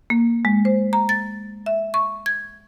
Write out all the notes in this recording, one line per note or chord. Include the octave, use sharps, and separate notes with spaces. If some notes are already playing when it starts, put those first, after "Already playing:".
A#3
G#3
C5
A#5
A6
E5
C#6
G#6